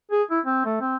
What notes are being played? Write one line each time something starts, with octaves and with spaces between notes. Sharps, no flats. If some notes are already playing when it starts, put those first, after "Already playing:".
G#4
E4
C4
A3
C4